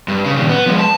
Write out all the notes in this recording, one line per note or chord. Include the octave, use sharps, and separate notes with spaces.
G2
C#3
A#2 D#3
B3
F3 G#3
A5